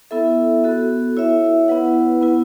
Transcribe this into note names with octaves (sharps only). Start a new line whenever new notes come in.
B3 E4 A4 E5
B3 F#4 A4
E4 C#5 E5
B3 E4 B4 F#5
B3 E4 B4